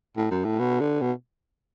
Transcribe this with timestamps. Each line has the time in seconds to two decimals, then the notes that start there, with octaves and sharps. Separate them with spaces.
0.17 A2
0.31 F#2
0.45 A2
0.59 B2
0.80 D3
1.01 B2